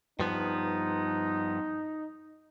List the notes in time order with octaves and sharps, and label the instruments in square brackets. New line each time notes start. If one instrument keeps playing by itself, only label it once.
[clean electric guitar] G2 F3 B3 [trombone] D#4